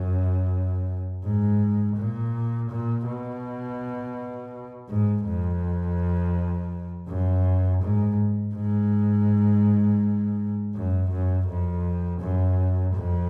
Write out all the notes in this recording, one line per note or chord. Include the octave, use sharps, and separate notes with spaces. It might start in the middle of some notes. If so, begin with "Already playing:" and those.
Already playing: F#2
G#2
A#2
A#2
B2
G#2
F2
F#2
G#2
G#2
F#2
F#2
F2
F#2
F2